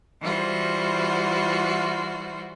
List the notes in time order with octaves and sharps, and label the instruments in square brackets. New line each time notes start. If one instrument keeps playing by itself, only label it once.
[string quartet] E3 G3 F4 F#4 C5